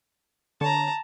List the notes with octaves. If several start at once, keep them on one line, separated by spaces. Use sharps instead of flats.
D3 C#5 A5 A#5